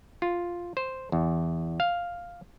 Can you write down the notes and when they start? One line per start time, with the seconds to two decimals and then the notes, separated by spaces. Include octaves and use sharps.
0.22 F4
0.77 C5
1.12 E2
1.80 F5